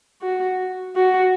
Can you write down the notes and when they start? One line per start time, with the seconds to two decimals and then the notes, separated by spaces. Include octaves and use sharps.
0.22 F#4
0.96 F#4